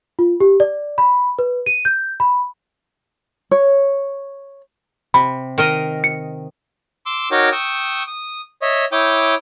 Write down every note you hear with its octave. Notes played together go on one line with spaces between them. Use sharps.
F4
G4
D5
B5
B4
D#7
G6
B5
C#5
C3 B5
D#3 A#4 D#5
C#7
C6 D6 E6
D#4 F#4 A#4 C#5 G5 D6
G5 C#6 D#6 E6
D#6
C#5 D#5 E5
E4 C#5 G5 D6 D#6 G6